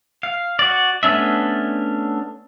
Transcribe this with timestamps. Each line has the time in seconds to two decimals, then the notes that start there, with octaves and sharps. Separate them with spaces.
0.23 F5
0.59 F#4 D5
1.03 A3 B3 C#4 D4 E5